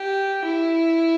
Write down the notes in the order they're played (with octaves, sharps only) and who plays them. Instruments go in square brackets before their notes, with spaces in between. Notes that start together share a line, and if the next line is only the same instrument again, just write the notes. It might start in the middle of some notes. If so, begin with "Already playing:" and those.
Already playing: [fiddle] G4
E4